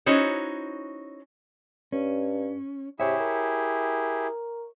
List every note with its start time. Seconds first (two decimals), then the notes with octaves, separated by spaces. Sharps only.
0.06 C#4 D#4 E4 F#4 C5 C#5
1.92 G2 C#4
3.00 C3 E4 G4 G#4 C#5 E5
3.20 A#4